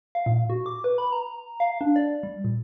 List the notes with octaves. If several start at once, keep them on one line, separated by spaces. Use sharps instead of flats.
F5
A#2
F#4
D6
B4
B5
A#5
F5
D4
D5
G3
A#2